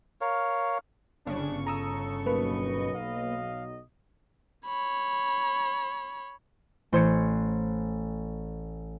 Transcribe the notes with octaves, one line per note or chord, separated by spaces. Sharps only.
A#4 C#5 F5
G1 C#3 D4 C#6
A4 A#5 D#6 E6
B1 F#3 A#3 B4 D#5 B5
F5
C#5 B5
A1 C5 G#6 C#7